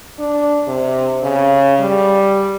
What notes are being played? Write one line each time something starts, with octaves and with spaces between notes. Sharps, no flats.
D4
C3
C#3
G3